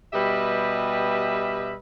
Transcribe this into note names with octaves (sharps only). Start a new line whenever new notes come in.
B2 G3 G4 B4 D#5 E5